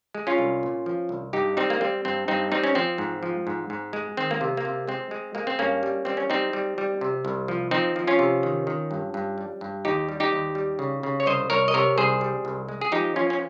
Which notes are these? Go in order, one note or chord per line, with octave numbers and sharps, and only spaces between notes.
G#3
C#4 F4
C2
A#2
F3
C2
G2 D#4 G4
G3 C4 D#4
A#3
G3 C4
G2 C4
G2 C4 D#4
G3 C4 D#4
C#4
F3 C4
G#2
F3
G#2
G#2
G#3
D#3 C4
A#3
C3
A#3
C3
G#3 C4
G#3
G#3 A#3
C4
G2 A#3 C#4
G3
G3 C4
C#4
G3 C4 D#4
G3
G3
C3
C2
F3
F3 C4 D#4
F3
C#4 F4
C3
D#3
D#3
G2
G2
G3
G2
D#2 D#4 G4
G3
D#4 G4
D#2
G3
C#3
C#3
C#5
C2 C5 D#5
C2 A#4 C#5
D#5
C3 A#4 C#5
C2 G#4 C5
G3
C2
G#3
G#4
F3 D#4 G4
F3 C#4 F4
C#4